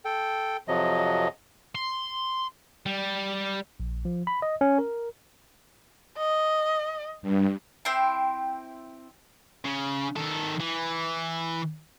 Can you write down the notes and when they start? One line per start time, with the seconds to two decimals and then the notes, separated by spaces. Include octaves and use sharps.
0.05 A4 G5
0.68 F2 C3 F3 F#3 D#5
1.75 C6
2.86 G3
3.80 A#1
4.05 F3
4.27 B5
4.42 D#5
4.61 C#4
4.78 A#4
6.18 D#5
7.22 G2
7.85 C4 E4 G5 C6
9.65 C#3
10.16 D#3 A4
10.60 E3